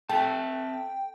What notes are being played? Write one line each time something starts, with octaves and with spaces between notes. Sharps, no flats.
C4 A4 E5 G5 A5